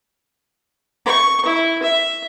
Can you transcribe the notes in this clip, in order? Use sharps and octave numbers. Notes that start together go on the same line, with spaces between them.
C#6
E4
E5